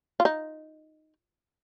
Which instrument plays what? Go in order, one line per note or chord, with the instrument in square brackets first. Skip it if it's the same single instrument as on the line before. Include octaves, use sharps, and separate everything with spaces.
[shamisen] F4
D#4